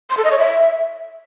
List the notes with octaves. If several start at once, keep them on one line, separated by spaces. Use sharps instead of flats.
C6
A4
D#5
C#5
E5